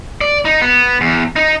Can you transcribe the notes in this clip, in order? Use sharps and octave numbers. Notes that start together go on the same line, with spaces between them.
D5
D#4
B3
E2
D#4